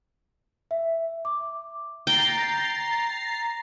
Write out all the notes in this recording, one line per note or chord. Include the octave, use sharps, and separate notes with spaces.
E5
D6
G5 A#5 A6 C7